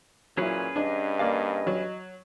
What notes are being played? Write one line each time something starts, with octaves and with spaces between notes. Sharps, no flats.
A#2 F#3 C#4 E4 G#4 B4
G2 D4 D#5
A#3 D5 F5
F#3